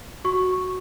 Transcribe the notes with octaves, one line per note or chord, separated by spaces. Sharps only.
F#4 C#6